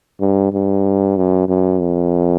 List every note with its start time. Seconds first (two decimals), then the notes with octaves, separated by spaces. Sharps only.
0.20 G2
0.53 G2
1.17 F#2
1.48 F#2
1.80 F2